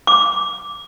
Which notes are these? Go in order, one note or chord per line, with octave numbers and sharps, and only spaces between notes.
D6